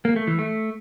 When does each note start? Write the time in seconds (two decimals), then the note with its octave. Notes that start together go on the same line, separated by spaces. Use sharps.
0.05 A#3
0.16 A3
0.27 E3
0.39 A3